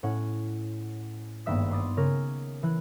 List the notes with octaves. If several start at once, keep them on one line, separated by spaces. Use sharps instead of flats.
A2 C#4 F#5
G#1 G2 A#3 B3 E5 D#6
B5 C6 D6 D#6 A6
C#3 C#4 A#4
E3 F#6